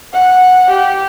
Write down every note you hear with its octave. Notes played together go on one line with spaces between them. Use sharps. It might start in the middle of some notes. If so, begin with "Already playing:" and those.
F#5
G4